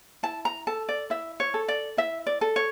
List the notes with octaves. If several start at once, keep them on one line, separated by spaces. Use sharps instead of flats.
E4 A5
A#5
A4 A5
D5
E4 E5
C#5
A4
D5
E4 E5
D5
A4
C#5